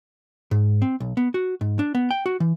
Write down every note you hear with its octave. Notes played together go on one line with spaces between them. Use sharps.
G#2
C4
B1
B3
F#4
G#2
D4
B3
G5
F#4
E3